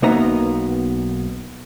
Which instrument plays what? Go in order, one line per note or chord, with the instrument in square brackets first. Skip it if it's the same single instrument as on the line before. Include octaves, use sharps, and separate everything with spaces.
[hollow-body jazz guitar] B1 A#3 B3 D#4 E5 A#5